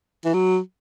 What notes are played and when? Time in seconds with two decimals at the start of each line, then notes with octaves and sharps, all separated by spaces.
0.25 E3
0.34 F#3